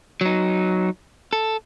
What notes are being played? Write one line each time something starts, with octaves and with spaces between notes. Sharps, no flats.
F#3 D#4
A4